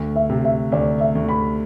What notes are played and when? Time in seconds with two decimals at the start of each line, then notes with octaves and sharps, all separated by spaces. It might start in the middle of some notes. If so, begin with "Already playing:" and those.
Already playing: D2
0.16 E5
0.30 C3
0.45 E5
0.72 D2 D5
1.00 E5
1.15 D2
1.29 B5